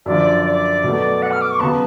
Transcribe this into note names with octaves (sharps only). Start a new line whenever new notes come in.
F#2 D3 F3 D5
D5
B2 F#3 A3
F#5
F6
D6
C#6
C#3 F#3 B3 A5